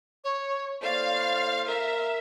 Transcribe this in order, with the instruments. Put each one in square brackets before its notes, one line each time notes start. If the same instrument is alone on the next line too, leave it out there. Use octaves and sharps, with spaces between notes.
[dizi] C#5
[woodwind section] A2 A#3 C5 [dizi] D5 [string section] F5
[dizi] A#4 [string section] E5